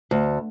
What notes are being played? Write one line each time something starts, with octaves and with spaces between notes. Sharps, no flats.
D2